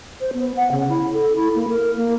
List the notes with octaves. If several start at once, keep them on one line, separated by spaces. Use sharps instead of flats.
C5
B3
F#5
C#3
E4
A4
E4
A#3
A#4
A#3